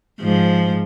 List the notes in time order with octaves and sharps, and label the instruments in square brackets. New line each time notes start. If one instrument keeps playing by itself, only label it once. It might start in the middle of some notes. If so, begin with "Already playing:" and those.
[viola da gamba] G#2 F3